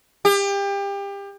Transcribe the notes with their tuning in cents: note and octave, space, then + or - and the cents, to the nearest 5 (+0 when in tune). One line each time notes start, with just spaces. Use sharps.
G4 +30